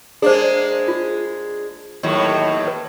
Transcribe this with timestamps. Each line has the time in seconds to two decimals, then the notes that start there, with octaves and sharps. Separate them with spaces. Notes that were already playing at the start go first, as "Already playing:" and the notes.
0.22 G#3 A#3 D4 G#4 C5
0.88 F4
2.03 D#2 A2 F#3
2.68 B4